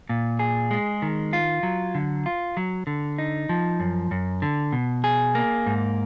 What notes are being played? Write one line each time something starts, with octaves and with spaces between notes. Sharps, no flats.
A#2
G#4
G#3
D#3
F4
F#3
D3
F4
F#3
D3
D#4
F3
F#2
F#2
D3
B2
G#4
A#3
G#2